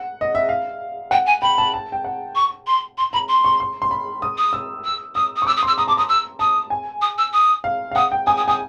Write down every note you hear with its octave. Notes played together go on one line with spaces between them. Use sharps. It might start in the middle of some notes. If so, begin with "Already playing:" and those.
Already playing: F#5
D#5
E5
F5
F#5 G5
G#5
G5 B5
A5
A5
G5
F#5
C#6
C6
C6
A#5 B5
C6
C#6
C6
C6
B5
D#6
D#6
E6
E6
D#6 E6
D#6
C#6
D6 E6
D#6
C6
E6
A#5 D#6
A5 D6
A#5 D#6
E6
A5 D#6
G#5
D#6
E6
D#6
F5
F5
F#5 D#6
G5
G#5 D#6
D#6
G#5 D#6